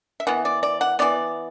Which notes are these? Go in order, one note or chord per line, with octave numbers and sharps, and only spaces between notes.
E5
E3 B3 F#5
D5
D5
F#5
E3 B3 D5